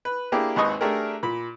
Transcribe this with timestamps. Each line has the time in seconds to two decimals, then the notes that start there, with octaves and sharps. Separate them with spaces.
0.05 B4
0.32 A#3 D4 E4 G4 G#4
0.56 G#1 D#2 B4 D#5 C#6 D#6
0.81 A3 D4 G4 G#4 A#4
1.23 A#2 B5